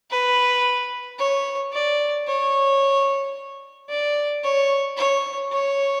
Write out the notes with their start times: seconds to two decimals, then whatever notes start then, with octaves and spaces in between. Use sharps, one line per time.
0.11 B4
1.19 C#5
1.73 D5
2.28 C#5
3.90 D5
4.44 C#5
4.97 C#5
5.52 C#5